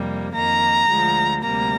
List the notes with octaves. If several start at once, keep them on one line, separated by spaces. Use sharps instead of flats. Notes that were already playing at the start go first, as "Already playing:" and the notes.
Already playing: F2 C3 G3 A#3
F2 D#3 A#3 A#5
D2 D3 F3 G#3
D2 C3 G3 A#3 A#5